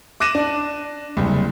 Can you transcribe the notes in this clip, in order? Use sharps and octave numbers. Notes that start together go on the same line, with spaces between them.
D6 F#6 A#6 D#7 E7
D4
F#1 C2